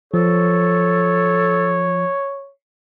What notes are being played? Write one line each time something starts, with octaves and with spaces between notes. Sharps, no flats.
F3 A4 C#5